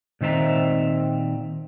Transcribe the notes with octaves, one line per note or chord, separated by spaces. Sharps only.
A#2 D#3 C4 E5 A#5